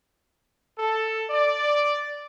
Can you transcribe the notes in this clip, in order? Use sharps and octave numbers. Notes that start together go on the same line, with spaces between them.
A4
D5